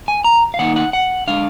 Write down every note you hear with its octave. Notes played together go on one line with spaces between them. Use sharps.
G#5
A#5
F5
D#3 A#3 D#4 F#5
F#5
F#5
D3 G#3 D4 F5